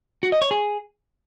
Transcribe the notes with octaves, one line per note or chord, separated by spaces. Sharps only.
F#4
D#5
C#5
G#4